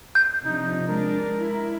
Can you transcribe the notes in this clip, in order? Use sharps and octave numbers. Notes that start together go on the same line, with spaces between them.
G6
C3 F3 D4 D#4
G#3 D4 A#4
E4